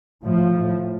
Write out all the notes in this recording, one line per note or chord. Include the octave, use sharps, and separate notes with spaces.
A2 F3
A2